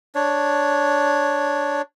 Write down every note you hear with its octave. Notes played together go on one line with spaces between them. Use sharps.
D4 C#5